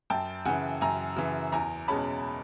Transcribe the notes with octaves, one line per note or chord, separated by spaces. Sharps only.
F#2 G5 A5
C#3 E3 F#5 G#5
F#2 G#5 A#5
C#3 E3
E2 G#5 A#5
B2 G#3 C#4 A5 B5